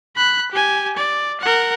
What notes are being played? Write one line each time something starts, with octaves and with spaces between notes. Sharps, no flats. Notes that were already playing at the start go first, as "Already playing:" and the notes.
B5 F#6
G4 G#5
D5
A#4 F#5